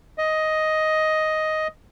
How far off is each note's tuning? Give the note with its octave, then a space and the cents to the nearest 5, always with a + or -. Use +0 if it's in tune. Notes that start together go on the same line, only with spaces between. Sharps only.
D#5 +5